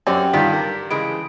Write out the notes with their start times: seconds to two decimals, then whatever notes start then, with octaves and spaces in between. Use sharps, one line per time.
0.07 F#2 C4 G4 C#5 D5 F#5 G5
0.34 G2 D#3 G3 F4 D5 G6 B6
0.54 A#4
0.91 C#3 E3 G#3 D7